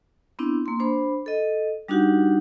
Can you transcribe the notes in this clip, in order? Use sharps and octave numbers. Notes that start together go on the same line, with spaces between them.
B3 C4 D4 E4
A#3 C6
D4 C5 B5
A4 D#5
G3 D4 D#4 F#4 G4 F#5